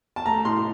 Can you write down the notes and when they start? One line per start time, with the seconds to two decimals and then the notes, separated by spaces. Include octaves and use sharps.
0.16 A5
0.26 A3 A#5
0.45 A2 C6